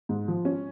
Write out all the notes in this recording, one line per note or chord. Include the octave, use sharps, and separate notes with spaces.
G#2
F3
C#4